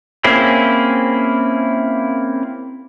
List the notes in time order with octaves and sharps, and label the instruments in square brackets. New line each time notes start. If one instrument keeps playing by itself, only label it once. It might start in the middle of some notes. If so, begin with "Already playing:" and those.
[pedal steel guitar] A#3 C4 C#4 E4 G#4